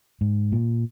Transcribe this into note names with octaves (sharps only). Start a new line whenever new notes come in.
G#2
A#2